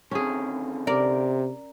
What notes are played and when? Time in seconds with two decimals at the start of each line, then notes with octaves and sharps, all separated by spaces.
0.11 D3 D#3 C4 C#4 G#4
0.87 C3 A#4 D5